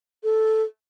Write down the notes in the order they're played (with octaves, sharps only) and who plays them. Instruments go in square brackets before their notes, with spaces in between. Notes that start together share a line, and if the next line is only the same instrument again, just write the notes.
[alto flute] A4